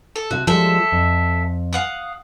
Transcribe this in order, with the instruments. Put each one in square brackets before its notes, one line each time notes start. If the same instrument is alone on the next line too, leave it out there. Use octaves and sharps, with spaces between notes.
[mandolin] A4
[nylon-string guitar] C3 E5 A5 [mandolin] F#4
[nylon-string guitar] F3 G3 G#3 [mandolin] A4 E5
[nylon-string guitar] F2
[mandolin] F5 F#5 D#6